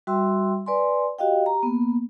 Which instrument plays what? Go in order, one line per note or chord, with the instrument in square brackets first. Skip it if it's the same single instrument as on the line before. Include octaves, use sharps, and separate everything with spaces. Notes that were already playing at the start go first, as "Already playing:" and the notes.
[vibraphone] G3 F#4 E5 G5 C6 E6
B4 D5 G#5 C6
F#4 G4 D#5 F5 G5
G4 A#5
A#3 B3